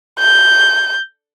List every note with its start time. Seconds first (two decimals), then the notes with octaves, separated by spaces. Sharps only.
0.19 G6